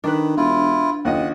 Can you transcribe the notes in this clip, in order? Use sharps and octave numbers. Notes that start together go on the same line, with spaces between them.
D#3 D4 B4
E1 E4 F4
F#1 D#2 F4 D#5 F#5